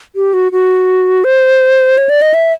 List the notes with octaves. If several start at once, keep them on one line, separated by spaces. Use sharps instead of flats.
G4
F#4
F#4
C5
C#5
D5
D#5
E5